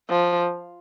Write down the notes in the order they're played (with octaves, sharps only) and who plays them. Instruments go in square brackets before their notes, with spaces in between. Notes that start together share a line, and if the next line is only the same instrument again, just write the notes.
[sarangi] F3